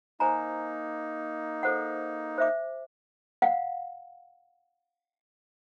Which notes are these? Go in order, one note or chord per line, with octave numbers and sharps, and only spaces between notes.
A#3 D#4 C5 G#5 A#5
A4 C5 F#5
C5 E5 D6
F5 F#5